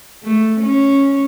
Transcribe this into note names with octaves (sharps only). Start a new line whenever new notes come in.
A3
C#4